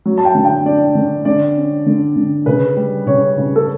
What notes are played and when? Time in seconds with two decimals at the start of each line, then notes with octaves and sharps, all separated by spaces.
0.06 F#3
0.18 A5
0.25 G5
0.35 D3
0.45 G5
0.66 D4 D5
0.95 D3
1.25 D3 D5
1.56 C#4
1.86 D3
2.16 D3
2.46 C#3 B4
2.76 G3
3.06 C#3 C#5
3.38 C#3
3.56 A4